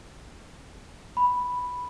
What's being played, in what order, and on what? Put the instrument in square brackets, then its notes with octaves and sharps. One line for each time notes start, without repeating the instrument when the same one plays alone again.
[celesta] B5